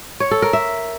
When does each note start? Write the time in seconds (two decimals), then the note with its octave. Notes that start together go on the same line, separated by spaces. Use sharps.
0.20 C#5
0.31 A4
0.42 A#4
0.53 E5